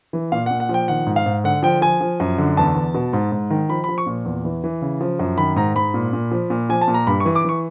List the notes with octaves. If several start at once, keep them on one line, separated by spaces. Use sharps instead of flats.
E3
A#2 F5
A#2 F#5
F#5
F3
G5
D#3 F#5
G#2
F5
G#2
D3 F#5
F3 G5
F3 G#5
F3
F#2
D3
E2 A5
E2
B2
G#2
G#2
D#3
F3 B5
F3 B5
C#6
A#2
E2
E3
E3
C#3
F3
F#2
D#3 B5
G#2 A#5
G#2 B5
A#2
A#2
F3
A#2
F3 G#5
A5
A#2
A#5
G2 B5
C#6
E3
D6
E3 C#6